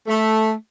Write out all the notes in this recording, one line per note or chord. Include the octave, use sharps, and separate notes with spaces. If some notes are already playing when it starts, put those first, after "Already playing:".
A3